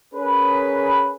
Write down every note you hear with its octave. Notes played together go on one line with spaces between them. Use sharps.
C#4 G#4 A#4 B4